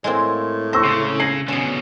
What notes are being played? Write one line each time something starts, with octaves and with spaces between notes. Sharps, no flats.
A2 G#3 A#3 C4
C5 C#6 E6 A#6
C#3
G#5 A#6 C7 F#7
B2 D3 C#4 G#4